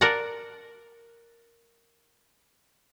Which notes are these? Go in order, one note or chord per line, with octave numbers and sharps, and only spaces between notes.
A#4 D5 F#5 A5 A#5